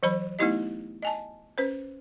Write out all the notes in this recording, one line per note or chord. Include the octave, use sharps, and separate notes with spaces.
E3 F#3 C5 B5
A3 B3 D#4 E4 G4 D#5
D#5 G#5 A5
C#4 B4 C5